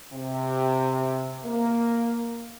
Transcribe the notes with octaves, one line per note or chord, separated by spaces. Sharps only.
C3
A#3